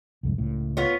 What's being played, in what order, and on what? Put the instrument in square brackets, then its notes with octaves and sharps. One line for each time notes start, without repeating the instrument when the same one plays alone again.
[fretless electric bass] C2 F2 G#2
C#2 A2
[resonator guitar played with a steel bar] B3 F4 C#5